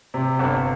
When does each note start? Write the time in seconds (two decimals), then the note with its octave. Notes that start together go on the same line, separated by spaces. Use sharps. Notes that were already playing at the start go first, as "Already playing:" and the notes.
0.14 C3
0.39 G1